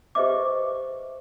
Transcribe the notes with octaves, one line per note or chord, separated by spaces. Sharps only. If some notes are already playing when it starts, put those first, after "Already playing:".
G4 B4 C5 D#5 E5 D6